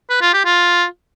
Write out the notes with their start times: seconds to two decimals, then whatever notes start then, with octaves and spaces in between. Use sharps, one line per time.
0.10 B4
0.22 F4
0.33 G4
0.45 F4